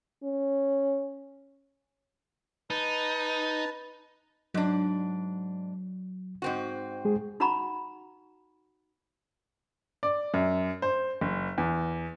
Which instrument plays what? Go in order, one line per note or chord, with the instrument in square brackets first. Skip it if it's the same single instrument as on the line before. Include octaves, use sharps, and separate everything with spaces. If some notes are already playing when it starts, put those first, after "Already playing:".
[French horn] C#4
[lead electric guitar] D#4 [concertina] B4 A5
[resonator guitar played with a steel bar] G#2 D4 [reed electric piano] F#3
[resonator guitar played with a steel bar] G#2 C4 F#4
[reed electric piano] G#3 G#4
[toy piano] D#4 F#4 F#5 A#5 B5 C#6
[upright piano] D5
F#2
C5
F#1
E2